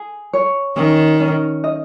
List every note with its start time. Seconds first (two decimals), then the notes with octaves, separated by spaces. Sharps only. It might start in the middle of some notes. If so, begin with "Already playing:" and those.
Already playing: G#4
0.33 C#5
0.76 D#3 C#4
1.20 C#4
1.64 D#5